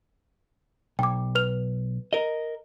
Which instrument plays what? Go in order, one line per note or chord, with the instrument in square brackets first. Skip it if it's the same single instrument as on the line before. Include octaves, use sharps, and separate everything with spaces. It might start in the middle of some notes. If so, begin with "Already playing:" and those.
[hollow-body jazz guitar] B1 [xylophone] G5 D6
[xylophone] B4 F6 F7
[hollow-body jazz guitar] A#4 D#5